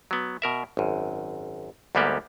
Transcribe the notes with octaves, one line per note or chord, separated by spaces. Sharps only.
F#3 B3
B2 A#4 E5
G#1 F#2
D2 G#2 G3 A#3 B3 G4